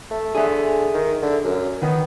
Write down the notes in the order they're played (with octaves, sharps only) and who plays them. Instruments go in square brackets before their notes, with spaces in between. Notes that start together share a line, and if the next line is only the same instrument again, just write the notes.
[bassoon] A3
[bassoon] D3 [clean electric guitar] G#4 E5
[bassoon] D#3
D3
F#2
[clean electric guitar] D#3 [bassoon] B3